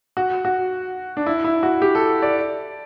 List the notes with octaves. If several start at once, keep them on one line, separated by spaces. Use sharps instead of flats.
F#4
F#4
D4
E4
E4
F#4
G4
A4
D5